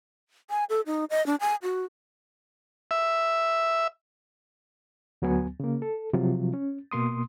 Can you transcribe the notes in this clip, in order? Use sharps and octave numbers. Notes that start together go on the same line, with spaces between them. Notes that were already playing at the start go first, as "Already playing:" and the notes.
G#5
A4
D#4
D#5
D4
G#5
F#4
E5
D2 F#3 B3 G#5
C#3 A#3
A4
C3 F3 F#3 F4
C#4
B2 A#3 C6 D#6